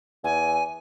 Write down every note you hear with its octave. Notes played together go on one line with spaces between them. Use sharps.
E2 G#5